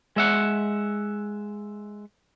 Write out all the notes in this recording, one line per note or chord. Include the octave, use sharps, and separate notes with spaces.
G#3 E5 F#5